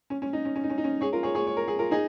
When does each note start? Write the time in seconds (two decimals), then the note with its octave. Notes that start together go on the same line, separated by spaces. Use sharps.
0.10 C#4
0.22 C#4
0.33 D#4
0.45 C#4
0.56 C#4
0.63 D#4
0.70 C#4
0.78 D#4
0.84 C#4
1.01 G#4 C#5
1.13 F4 A#4
1.23 G#4 C#5
1.35 G#4 C#5
1.47 C#5
1.57 A#4
1.68 G#4
1.79 F4 A#4
1.91 D#4 G#4